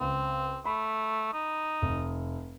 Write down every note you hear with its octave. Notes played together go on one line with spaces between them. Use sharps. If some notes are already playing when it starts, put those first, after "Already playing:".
C#2 C4
A3 B5
D#4
F1